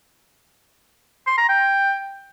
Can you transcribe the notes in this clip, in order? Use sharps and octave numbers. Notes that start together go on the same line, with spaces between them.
C6
A#5
G5